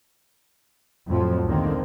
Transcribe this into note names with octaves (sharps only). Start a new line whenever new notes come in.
F2 A2 F3 F#3
C#2 D3 D#3 A#3 C4